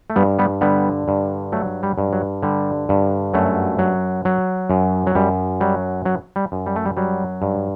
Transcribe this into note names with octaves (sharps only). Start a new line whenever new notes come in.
A3
G2 G3 B3
G3 B3
D3 G3 B3
G2
F#3 A3
G3
G2
F#3
D3 G3
G2
F#2 F#3 A3
F#3
F#3
F#2
F#3
F#2 G3
F#3 G3
F#3
G3
F#2
G3
A3
G3
F#3 G3
G2